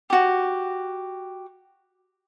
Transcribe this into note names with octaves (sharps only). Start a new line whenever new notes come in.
F#4 G4